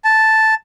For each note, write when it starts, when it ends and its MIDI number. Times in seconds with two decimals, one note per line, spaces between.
0.04 0.54 81